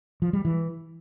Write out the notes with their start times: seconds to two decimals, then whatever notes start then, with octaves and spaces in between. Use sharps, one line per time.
0.22 F3
0.33 G3
0.45 E3